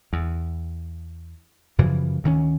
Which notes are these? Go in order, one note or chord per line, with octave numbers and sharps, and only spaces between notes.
E2
F#2 C#3 E3 F3
D2 D#3 G3 C#4